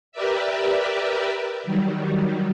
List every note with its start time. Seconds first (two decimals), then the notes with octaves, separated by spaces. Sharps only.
0.12 G4 A#4 B4 D5 E5
1.64 D#3 F#3 G3